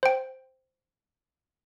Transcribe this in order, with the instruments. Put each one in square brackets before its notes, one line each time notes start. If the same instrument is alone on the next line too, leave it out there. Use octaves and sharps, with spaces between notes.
[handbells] C5 G5